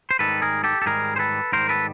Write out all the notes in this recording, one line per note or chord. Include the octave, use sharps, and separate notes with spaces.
C5
G#2 D#3 G3 A4 B4
G#4 A#4
G4 A4
A4
G#2 D#3 G3 G#4 A#4
C5
A4 B4
G#2 D#3 G3 A#4 C5
A4 B4